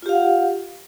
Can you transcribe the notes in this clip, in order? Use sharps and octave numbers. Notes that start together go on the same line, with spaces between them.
F4 G4 F5 F#5